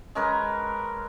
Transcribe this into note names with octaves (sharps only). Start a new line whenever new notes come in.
G#3 C#4 A#4 B4